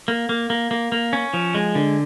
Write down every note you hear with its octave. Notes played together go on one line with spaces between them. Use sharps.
A#3
A#3
A#3
A#3
A#3
C#4
F3
G#3
D3